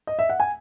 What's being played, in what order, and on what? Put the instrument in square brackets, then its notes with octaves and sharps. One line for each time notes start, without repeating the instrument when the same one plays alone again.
[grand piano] D#5
E5
F#5
G#5